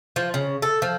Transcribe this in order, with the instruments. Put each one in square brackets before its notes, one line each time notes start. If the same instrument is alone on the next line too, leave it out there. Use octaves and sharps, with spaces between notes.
[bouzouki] F3
C#3
A4
F3